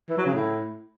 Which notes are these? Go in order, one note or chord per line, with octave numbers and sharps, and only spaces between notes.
E3
F#3
C#3
A2